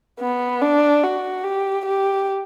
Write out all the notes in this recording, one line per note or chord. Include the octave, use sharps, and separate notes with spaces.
B3
D4
F#4
G4
G4